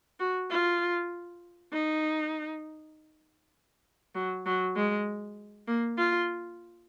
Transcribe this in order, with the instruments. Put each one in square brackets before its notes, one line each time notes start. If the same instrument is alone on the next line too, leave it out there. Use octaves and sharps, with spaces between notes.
[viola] F#4
F4
D#4
F#3
F#3
G#3
A#3
F4